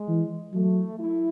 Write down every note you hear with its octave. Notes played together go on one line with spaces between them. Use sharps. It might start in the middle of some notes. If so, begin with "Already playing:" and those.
Already playing: G#3
E3
F#3 A3
E4